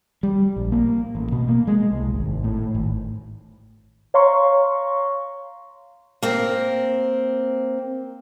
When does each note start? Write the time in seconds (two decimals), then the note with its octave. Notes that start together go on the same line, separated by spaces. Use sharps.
0.23 G3
0.56 A#1
0.72 A#3
1.15 A1
1.32 B2
1.49 A#3
1.67 G#3
1.92 C2
2.14 G#1
2.44 A2
2.75 G#1
4.14 C#5 F5 A#5 C6 C#6
6.23 A#3 C4